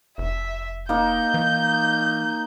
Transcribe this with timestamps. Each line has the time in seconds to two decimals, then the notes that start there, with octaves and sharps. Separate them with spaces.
0.18 F1 E5
0.89 A#3 D#4 G6
1.34 E3